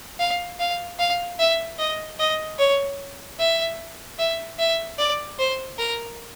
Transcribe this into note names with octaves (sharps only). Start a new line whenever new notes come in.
F5
F5
F5
E5
D#5
D#5
C#5
E5
E5
E5
D5
C5
A#4